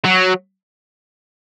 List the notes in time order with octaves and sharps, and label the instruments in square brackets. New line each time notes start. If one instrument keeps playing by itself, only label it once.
[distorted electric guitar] F#3